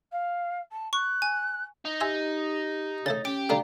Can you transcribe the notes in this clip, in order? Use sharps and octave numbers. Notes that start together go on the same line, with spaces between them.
F5
A5
C#6 F#6
G#5
D#4
G4 E5 G#5 C6
C#3 A3 C#5 A6
C#4 G4 D7
D3 G3 A3 D5 F5 A#5